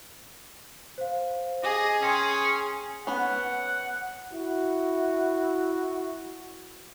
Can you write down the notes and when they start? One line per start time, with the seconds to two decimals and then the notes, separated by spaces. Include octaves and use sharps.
0.98 C5 F5
1.63 G#4 D#5 D6
2.02 C#4 G5 C6 D#6
3.07 B3 C#4 F#5
4.32 E4 F#4